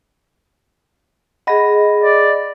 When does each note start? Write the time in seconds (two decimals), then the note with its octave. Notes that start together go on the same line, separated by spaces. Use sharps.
1.47 G#4 D#5 F#5 B5 A#6
2.04 D5